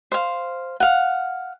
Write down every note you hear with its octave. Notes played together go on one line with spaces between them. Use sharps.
C5 F5
F5 F#5